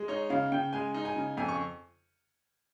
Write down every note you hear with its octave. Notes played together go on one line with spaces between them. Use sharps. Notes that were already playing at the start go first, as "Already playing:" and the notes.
Already playing: G#3
D#4 C#5
C#3 F5
C#3 G5
G#3 G#5
D#4
G#5
C#3
F2 G#5
C#6